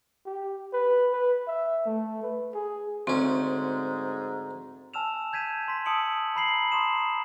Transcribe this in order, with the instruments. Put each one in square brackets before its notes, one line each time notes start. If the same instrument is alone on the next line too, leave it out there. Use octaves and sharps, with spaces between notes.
[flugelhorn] G4
B4
B4
E5
A3
B4
G#4
[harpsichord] D2 C#4 [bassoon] G#2 [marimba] C4
[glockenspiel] G#5 A5 E6 F6 E7 F7
G6 G#6 B6 D#7 E7
C6 B6
A5 D#6 E6 C#7 D7 F#7
A#5 B5 C7 F#7
A5 A#5 C6 C#6 D#6 E7